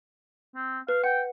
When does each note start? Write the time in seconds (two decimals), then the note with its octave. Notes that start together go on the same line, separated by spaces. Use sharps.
0.56 C4
0.89 B4 F5
1.04 F#5 G5